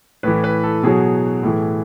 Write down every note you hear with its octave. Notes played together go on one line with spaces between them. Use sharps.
A2 E3 B4
B4
A4
B2 F#3 G#4
A2 E3